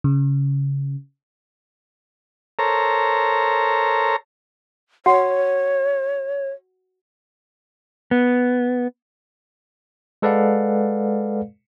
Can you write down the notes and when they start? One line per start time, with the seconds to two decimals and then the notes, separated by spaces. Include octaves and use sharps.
0.04 C#3
2.59 A4 A#4 C5 C#5 A#5
5.06 F#4 C#5 F#5
8.11 B3
10.22 G#3 A4 B4 D5 F5 F#5